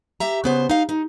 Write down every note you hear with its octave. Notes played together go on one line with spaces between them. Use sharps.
G4 E5 A#5
C#3 B3 C5
D#4 F5
D#4